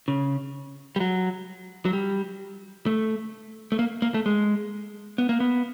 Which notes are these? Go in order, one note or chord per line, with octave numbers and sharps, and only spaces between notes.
C#3
G3
F#3
F#3
G3
A3
A3
A#3
A#3
A3
G#3
B3
A#3
B3